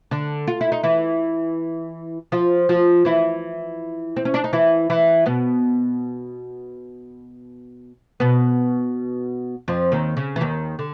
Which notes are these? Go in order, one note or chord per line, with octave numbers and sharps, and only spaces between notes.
D3 D4
F4
E4
D#4
E3 E4
F3 F4
F3 F4
E3 E4
C4
C#4
D4
D#4
E3 E4
E3 E4
B2 B3
B2 B3
F2 F3
D#2 D#3
C#3
E3
D#2 D#3
D3